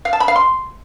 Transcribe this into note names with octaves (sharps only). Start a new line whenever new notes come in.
F5
A5
B5
F5
C6